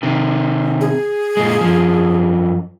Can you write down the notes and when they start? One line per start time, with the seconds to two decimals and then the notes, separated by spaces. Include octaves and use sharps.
0.03 C3 D#3
0.81 G#4
1.37 A#2 G#3
1.61 F#2 F3